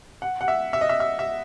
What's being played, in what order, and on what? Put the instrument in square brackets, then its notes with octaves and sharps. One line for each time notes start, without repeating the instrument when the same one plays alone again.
[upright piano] F#5
F#5
E5
E5
D#5
E5
E5
E5